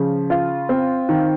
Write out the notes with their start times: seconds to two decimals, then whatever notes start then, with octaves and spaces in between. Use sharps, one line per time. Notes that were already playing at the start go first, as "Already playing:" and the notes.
Already playing: C#3 F3
0.30 F4
0.69 C4
1.09 D#3